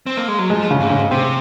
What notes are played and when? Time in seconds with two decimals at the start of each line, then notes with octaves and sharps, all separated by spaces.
0.07 C4
0.17 A#3
0.28 G#3
0.39 F#3
0.50 F3 G#3
0.71 C#3
0.80 G#2
0.90 C#3
1.11 C3 C4